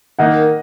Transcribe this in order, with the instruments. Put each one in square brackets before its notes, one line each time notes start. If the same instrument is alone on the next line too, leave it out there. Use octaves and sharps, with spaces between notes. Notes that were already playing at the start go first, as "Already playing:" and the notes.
[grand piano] D#3 A#3 D#4 [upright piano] D#5 F#5